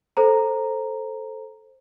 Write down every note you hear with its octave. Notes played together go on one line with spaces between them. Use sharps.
A4 C5 A#5